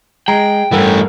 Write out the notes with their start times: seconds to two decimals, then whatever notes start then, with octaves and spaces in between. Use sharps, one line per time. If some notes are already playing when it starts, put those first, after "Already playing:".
0.28 G#3 G5 A#5
0.72 G2 E3 A3 A4 A#4 F#5